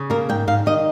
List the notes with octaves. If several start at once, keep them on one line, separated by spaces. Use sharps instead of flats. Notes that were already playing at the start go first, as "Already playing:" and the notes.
Already playing: C#3
A#3 A#4
G#2 G5
G#2 F5
D#3 D#5